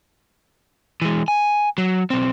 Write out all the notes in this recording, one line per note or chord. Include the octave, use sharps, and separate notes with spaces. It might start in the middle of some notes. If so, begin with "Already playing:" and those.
E3 G#3
G#5
F#3
B1 C4